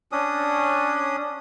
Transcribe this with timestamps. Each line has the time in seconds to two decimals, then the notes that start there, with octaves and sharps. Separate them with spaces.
0.12 C#4 D4 D#6